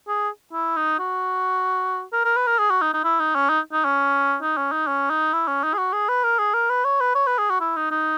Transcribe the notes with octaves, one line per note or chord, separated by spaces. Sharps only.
G#4
E4
D#4
F#4
A#4
A#4
B4
A#4
G#4
F#4
D#4
D#4
E4
D#4
C#4
D#4
D#4
C#4
D#4
C#4
D#4
C#4
D#4
E4
C#4
D#4
G#4
F#4
G#4
B4
A#4
G#4
A#4
B4
C#5
B4
C#5
B4
G#4
F#4
E4
D#4
D#4